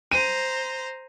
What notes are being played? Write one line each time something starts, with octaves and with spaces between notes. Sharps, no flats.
C5 A#5 D#7